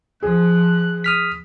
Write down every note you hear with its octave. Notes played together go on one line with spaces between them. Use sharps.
F3 G#4 F#6
D#6 F6 B6